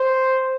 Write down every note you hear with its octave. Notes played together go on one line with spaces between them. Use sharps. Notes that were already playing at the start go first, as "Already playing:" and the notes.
Already playing: C5